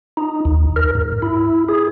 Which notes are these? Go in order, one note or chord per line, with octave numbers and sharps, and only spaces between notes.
D#4
D#2
A#4
G#2
E4
G#4